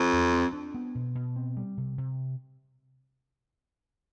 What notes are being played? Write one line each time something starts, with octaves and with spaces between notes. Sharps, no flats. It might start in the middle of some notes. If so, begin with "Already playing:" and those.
Already playing: F2
E2
C4
D4
B3
B2
B2
C4
G3
C3
C3